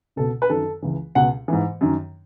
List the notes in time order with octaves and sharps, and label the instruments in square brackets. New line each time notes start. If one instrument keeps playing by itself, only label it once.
[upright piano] C#2 B2 A4
B4
F#2 D#3 A4
C#2 C#3 E3
C#2 B2 F#5
G#2 E3
F#2 D#3